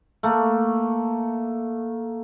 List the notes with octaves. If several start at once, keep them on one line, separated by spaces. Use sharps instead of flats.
A3 A#3